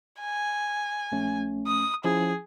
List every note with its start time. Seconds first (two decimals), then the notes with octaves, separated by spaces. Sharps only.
0.21 G#5
1.12 A#1 A3 C#4
1.67 D#6
2.04 F3 C#4 E4 G#4